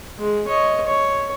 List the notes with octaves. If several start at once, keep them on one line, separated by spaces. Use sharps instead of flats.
G#3
C#5 D#5
C#5